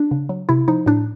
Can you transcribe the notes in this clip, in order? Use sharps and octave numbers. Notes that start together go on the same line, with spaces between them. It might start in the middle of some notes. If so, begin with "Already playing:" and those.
Already playing: D4
C#3
F#3
C3 E4
F3 D#4
A2 D4